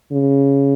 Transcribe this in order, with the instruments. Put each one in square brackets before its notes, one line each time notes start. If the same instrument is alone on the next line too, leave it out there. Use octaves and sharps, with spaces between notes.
[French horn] C#3